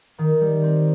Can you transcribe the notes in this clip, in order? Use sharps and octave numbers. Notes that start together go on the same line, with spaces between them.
D#3
G3
C4